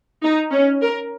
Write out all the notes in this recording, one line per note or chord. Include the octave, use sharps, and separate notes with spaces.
D#4
C#4
A#4